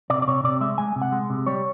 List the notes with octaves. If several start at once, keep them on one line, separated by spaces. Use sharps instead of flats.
C3 D5
D5
C3 C#5
C3 D5
G#3 E5
G#3 G#5
C3
F#5
G#3
C3
G3 C#5